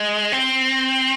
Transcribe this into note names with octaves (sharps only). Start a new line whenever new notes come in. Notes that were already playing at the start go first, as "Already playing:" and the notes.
Already playing: G#3
C4